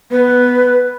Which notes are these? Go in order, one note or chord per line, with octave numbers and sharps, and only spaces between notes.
B3 B4